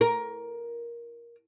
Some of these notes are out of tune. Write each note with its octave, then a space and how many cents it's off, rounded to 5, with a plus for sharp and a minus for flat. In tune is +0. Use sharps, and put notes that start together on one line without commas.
A#4 +15